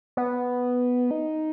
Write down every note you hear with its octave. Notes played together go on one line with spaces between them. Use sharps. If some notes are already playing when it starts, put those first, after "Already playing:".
B3
D#4